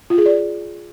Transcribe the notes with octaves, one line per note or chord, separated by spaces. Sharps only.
F4
G#4
D5